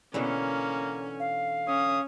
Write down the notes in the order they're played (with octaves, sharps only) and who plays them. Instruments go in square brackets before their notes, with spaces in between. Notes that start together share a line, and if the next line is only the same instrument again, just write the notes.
[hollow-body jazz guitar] B2 D3 E3 [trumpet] A#3 [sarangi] C#4
[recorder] F5
[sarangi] C#4 [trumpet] D#6